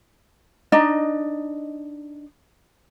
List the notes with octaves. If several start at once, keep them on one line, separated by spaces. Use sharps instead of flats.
D4 D#4 D#5